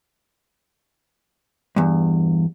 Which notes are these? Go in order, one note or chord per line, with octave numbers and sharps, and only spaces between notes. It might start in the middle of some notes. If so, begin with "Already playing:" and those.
E2 G2